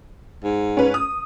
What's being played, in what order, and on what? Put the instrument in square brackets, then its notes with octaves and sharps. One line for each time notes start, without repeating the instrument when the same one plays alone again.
[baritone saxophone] G#2
[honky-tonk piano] C#4 B4
D#6